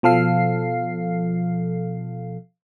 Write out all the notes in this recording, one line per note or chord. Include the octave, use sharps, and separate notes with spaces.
B2 F3 A4 F5 C7